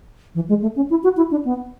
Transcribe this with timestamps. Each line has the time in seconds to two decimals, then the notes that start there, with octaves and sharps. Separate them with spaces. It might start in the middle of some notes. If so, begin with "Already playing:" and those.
0.35 E3
0.49 G#3
0.62 A3
0.76 C#4
0.90 E4
1.04 F#4
1.17 E4
1.31 D4
1.45 B3